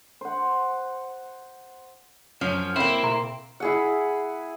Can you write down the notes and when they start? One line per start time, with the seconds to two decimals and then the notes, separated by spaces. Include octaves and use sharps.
0.21 C5 F#5
2.41 F#2 F3 C#4
2.76 A#3 C4 E4
3.03 B2 A#5 C6
3.60 E4 G#4 F#5